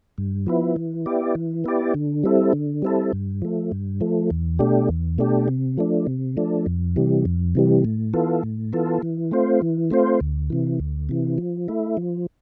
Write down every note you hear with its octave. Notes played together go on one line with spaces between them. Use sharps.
G2
F3 B3 E4
E3
B3 E4 G4 D5
E3
B3 E4 G4 D5
D3
G3 C4 E4 A4
D3
G3 C4 E4 A4
G2
F3 A3
G2
F3 A3
E2
B2 A3 D4 G4
E2
B2 A3 D4 G4
C3
F3 A3 D4
C3
F3 A3 D4
F2
C3 E3 G3
F2
C3 E3 G3
A2
E3 B3 F4 A4
A2
E3 B3 F4 A4
E3
A3 C4 F4 C5
E3
A3 C4 F4 C5
D2
C3 E3
D2
C3 E3
F3
A3 E4
F3